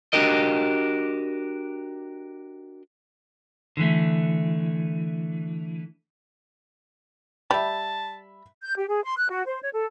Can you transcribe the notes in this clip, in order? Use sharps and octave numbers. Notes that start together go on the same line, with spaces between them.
D4 F#4 G4 A#4 D#5
D3 E3 A3
G3 E5 A5 B5
G6
G4
G#4
C6
F#6
F#4
C5
C#5
A4